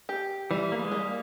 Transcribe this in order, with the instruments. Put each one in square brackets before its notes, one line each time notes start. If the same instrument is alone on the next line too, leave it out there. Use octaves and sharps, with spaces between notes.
[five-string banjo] G4
[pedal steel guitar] E3 [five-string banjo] G3
[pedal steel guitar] A#3
G#3
[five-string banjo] G3
[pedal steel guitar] A#3